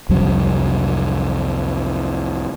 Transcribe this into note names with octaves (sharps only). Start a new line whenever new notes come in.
C2 F2 F#3 G3